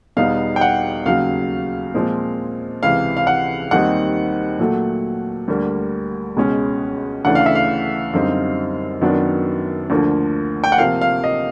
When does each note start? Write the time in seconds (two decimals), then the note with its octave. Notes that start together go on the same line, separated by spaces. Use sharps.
0.17 E2 B2 G3 B3 D#4 F5
0.56 G5
0.61 F#5
1.05 D#2 C#3 F#3 F5
1.94 A#2 F3 G#3 C4
2.83 C#2 C3 E3 F5
3.17 F5
3.27 F#5
3.71 D#2 D#3 G3 C4 D#4 F#5
4.59 A#2 F#3 A3
5.48 D2 D3 G3 A#3
6.37 C#2 B2 G#3 C#4
7.25 D2 C#3 E3 A3 D4 F#5
7.35 F5
7.46 E5
7.55 F5
8.13 F#2 D3 G3 C4 D#4
9.01 F#2 D#3 F#3 B3 D4
9.90 D2 D3 F3 A#3
10.64 G5
10.72 F#5
10.78 C3 F3 A#3 F5
11.01 F5
11.24 D#5